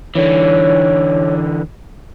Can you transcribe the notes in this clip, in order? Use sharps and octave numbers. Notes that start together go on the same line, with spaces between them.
D3 E3 C#5